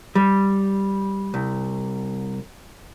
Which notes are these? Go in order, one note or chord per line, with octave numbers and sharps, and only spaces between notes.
G3
C2